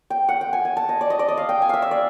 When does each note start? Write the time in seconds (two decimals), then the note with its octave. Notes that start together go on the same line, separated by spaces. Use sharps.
0.10 G5
0.29 F#5
0.41 G5
0.53 G#5
0.65 G#5
0.77 A5
0.89 D#5
1.01 D5
1.10 D#5
1.19 D5
1.28 D#5
1.38 F5
1.49 G5
1.62 G#5
1.69 E5 F5
1.82 E5
1.91 D5